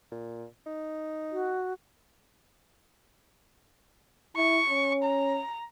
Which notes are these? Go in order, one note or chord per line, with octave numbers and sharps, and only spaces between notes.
A#2
D#4
F#4
E4 C#6
C#4
A#5